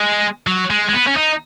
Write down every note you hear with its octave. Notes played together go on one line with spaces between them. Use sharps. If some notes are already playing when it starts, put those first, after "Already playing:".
Already playing: G#3
F#3
G#3
G#3
B3
C#4
D#4